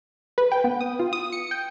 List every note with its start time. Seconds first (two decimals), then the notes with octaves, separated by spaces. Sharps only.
0.38 B4
0.52 G5
0.64 B3
0.81 D#6
0.99 F4
1.13 D#6
1.32 C#7
1.51 G5